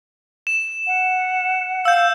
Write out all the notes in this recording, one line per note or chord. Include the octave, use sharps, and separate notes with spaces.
E7
F#5
F5 E6 G6